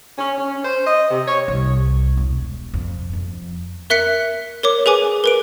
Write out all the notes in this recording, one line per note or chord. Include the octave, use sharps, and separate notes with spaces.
C#4
C#4
C5
D#5
C3
C#5
C2
E1
F2
F2
A#4 E5 F#6 B6 C#7
A#4 C#5 D6
G#4 B4 G#5 D6
A#4 B4 D7